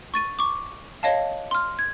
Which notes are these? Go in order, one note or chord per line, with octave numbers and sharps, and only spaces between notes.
C#6 A6 D#7
C#6 D6
C#5 D#5 F5 A5
C6 F6
G#6